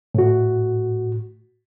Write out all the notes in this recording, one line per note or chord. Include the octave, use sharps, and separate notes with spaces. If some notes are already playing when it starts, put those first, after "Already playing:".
A2 F#4